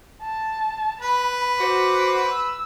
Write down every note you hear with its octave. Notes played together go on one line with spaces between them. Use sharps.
A5
B4 B5
F#4 C5 D6
E6